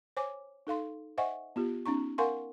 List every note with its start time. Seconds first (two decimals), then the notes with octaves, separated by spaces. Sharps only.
0.17 C5 C#5 G#5 D6
0.67 D#4 A4 F5 C6
1.18 C5 D#5 E5 F#5 G#5 C#6
1.56 B3 F4 G4
1.86 B3 C#4 D#4 A#5 C#6
2.18 A#4 F5 F#5 G#5 C6 C#6